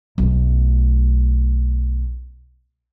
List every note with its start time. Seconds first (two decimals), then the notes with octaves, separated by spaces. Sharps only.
0.18 B1 A3